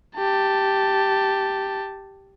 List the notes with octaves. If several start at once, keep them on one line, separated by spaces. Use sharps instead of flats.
G4 A5